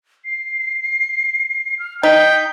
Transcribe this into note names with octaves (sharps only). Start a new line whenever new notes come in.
C7
F6
D#4 G5 B6